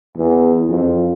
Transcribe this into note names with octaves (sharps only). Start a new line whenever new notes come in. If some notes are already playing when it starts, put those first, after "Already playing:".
E2
F2